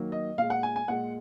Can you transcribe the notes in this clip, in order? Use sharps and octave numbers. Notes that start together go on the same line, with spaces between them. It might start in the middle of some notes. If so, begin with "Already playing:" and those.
Already playing: D#3 F#3 A#3
D#5
A#2 G#3 F5
F#5
G#5
G#5
A#2 G#3 F#5